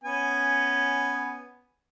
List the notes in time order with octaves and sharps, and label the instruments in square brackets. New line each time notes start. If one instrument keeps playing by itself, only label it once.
[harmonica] B3 C#4 G#5